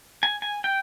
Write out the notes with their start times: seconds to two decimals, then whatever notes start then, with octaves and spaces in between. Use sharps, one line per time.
0.23 G#5
0.42 G#5
0.64 G5